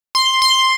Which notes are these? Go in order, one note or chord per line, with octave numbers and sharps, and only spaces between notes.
C6
C6